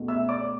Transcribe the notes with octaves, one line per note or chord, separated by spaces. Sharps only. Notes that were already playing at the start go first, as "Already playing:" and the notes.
Already playing: C#2 B2 A3
E5 E6
D5 D6